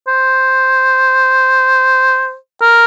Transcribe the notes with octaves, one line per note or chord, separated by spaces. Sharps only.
C5
A#4